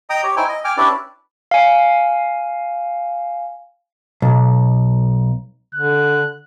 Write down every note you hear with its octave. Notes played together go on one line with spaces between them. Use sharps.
D#5 G5 A#5 D#6
G4 C#5
D#4 E4 C5 G5 G#5
D#5
G5 G#5 D6 F6
C#4 D4 E4 G4 B4 D5
F5 G#5
B1
D3 F#6